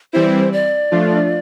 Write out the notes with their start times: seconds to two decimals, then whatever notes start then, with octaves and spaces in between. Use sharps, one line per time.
0.13 E3 G3 C4 E4 C5
0.53 D5
0.91 F3 A3 D4 F4